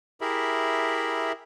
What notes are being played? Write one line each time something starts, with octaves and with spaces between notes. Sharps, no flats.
E4 G4 G#4 A#4 E5 B5